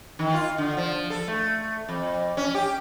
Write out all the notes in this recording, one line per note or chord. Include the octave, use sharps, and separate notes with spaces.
D#3
F4
D3
F3
A4
A3
F2
C#4
G4